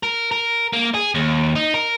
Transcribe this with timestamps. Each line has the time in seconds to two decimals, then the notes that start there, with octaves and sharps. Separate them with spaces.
0.03 A#4
0.32 A#4
0.73 A#3
0.94 G#4
1.15 D#2
1.56 D#4
1.74 A#4